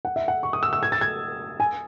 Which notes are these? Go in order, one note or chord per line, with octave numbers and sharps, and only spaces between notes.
F#5
E5
F#5
C#6
D#6
E6
E6
G#6
A6
G#6
G#5